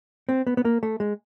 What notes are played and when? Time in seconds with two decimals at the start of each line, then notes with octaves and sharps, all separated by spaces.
0.29 C4
0.47 B3
0.57 B3
0.65 A#3
0.83 A3
1.00 G#3